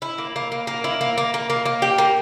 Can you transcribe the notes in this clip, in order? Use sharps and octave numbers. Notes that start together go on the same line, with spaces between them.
E4
A#3
A#3
A#3
A#3
E4
A#3
A#3
A#3
A#3
A#3
G4
A#3